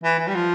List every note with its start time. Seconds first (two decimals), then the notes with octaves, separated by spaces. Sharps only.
0.04 E3
0.19 E3
0.28 G3
0.35 F3